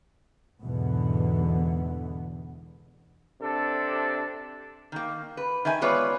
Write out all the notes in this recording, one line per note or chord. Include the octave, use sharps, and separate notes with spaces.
E2 G#2 B2 D3 E3 B3
C3 D4 A4
D#3 A#3
B4
D#3 E5 G#5
G#3 B3 F4 B4 C#5 D5